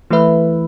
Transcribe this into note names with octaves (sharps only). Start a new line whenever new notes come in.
E3 A3 E4 B4 E5